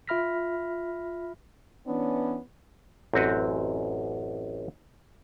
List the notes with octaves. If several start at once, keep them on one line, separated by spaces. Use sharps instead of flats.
F4 E5 B5 F6 A#6 B6
E3 B3 C#4 D4
A1 F#2 C4 F#4 B4